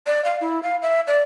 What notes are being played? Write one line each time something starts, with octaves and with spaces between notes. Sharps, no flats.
D5
F5
E4
F5
E5
D5